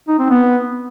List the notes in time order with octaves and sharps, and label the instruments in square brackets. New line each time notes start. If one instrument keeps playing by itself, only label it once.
[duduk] D#4
C4
B3